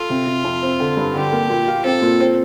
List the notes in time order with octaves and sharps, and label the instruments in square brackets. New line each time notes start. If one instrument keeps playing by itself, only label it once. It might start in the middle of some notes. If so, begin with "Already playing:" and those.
Already playing: [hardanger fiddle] F4 [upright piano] A4
[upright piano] C3
C3
F2
C4
D3
G2
[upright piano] D3 [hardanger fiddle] G4
[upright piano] A#3
A#2
F4
[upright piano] C4 [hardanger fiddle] A4
[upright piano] A#2
C4